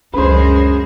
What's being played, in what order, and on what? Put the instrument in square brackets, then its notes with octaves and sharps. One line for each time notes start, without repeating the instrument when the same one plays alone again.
[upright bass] C#2 D4 [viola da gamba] F#2 G#3 G#4 [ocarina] C#4 [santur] B4 C5